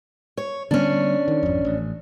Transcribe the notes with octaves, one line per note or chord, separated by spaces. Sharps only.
C#5
D3 G3 B3 C#4 D4
D#3
G#1 F2
A1